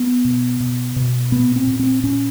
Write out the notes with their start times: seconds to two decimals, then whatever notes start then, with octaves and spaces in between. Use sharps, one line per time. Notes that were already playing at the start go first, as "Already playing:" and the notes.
Already playing: B3
0.25 B2
0.60 B2
0.96 B2
1.32 A#2 B3
1.56 C4
1.67 A#2
1.79 C4
2.04 A#2 C#4